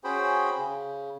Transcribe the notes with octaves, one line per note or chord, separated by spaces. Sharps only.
C#4 F#4 G#4 C5 G5 B5
C#3